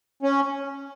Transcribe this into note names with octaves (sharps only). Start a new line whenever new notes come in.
C#4